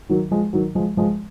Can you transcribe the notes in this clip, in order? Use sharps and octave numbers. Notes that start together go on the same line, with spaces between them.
D#3 F#3
F3 G#3
D#3 F#3
F3 G#3
F3 G#3